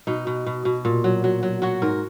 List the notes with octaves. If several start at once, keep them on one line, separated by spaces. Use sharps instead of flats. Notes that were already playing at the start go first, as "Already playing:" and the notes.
B2 D#4
B2
B2
B2
A#2
F#3
F#3
F#3
F#3 F#4
G#2 A#4